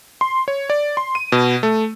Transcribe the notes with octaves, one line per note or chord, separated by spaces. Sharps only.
C6
C#5
D5
C6
D#7
B2
A3